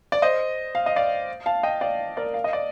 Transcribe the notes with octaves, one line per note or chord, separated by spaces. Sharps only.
D5
C5 D#5
F5
D#5
D5 F5
F5 A5
D#5 G5
D5 F5
A#4 D5
F5
D#5
D5